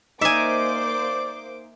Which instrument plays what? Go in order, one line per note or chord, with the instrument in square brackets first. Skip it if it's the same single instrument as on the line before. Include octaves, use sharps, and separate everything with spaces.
[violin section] A#3 C5 D6 [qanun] D#4 F5 [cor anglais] D5 [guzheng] E5 G#5